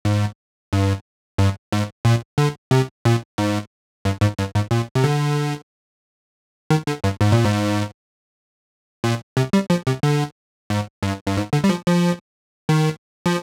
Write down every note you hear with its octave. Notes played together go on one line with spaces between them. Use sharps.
G#2
G2
G2
G#2
A#2
D3
C3
A#2
G#2
G2
G#2
G2
G#2
A#2
C3
D3
D#3
D3
G2
G#2
A#2
G#2
A#2
C3
G3
F3
C3
D3
G#2
G2
G2
G#2
D3
G3
F3
F3
D#3
F3